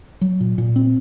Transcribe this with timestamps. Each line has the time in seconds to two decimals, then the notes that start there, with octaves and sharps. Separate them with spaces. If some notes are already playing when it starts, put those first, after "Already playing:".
0.21 F#3
0.40 A#2
0.58 A#2
0.76 C4